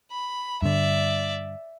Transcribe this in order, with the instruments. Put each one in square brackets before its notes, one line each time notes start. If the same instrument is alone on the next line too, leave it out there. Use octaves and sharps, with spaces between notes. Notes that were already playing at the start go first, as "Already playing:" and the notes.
[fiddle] B5
[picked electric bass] G2 D3 [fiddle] D5 E5